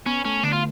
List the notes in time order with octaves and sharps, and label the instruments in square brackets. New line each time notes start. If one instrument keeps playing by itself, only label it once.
[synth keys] B3 [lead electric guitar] C#4
[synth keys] A3 [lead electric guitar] C#4
[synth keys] D3 [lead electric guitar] D4
[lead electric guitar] F4